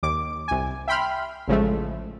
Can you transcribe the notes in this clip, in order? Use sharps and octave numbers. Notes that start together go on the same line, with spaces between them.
D#2 D6
C2 G#5
E5 G5 B5 C6 F6
A1 C#3 F3 G#3 A3